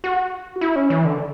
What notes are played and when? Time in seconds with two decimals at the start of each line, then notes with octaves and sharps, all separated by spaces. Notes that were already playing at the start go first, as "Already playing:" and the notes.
0.04 F#4
0.61 E4
0.76 C#4
0.90 E3
1.05 D3